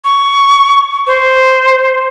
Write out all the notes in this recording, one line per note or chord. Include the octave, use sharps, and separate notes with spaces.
C#6
C5